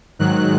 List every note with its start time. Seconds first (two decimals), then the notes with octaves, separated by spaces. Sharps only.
0.19 G#2 D#3 F#3 F#6